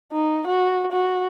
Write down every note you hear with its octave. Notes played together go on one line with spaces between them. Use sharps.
D#4
F#4
F#4